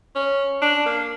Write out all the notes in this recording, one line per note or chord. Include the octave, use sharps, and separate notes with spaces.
C#4
D4
A#3